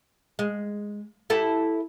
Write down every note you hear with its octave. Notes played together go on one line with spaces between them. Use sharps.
G#3
E4 G4 A4